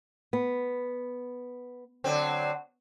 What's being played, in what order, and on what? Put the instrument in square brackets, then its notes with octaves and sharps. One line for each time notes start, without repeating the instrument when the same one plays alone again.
[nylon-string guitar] B3
[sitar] D3 F#3 C4